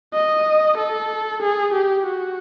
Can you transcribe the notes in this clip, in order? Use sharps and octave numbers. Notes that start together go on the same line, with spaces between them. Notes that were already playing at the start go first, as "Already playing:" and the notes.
D#5
A4
G#4
G4
F#4